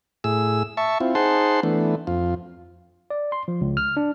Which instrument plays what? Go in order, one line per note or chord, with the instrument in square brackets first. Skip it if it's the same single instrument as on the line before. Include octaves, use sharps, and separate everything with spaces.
[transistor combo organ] A2 G#4 E6
E5 A5 C#6
C4 E4 F4
D#4 G#4 C5 F#5 A5 C6
E3 A3 B3 D4
F2 F4
[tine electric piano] D5
C6
F3
C#2
F6
D4